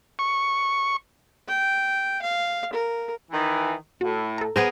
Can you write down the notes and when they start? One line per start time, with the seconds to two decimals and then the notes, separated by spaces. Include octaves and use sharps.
0.19 C#6
1.48 G5
2.22 F5
2.73 A#4
3.31 D#3 E3
4.01 A2 F#4
4.38 A4 A#5
4.56 B3 G#4 A#4 C5